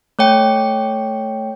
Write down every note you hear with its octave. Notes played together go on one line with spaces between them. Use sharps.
A3 C#5 G5